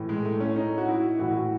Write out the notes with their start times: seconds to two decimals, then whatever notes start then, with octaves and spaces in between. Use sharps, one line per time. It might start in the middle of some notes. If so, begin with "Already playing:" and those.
Already playing: A2 E3
0.09 G#3
0.25 A3
0.40 C#4
0.56 D#4
0.78 F#4
0.88 E4
1.19 A2 E3 F#4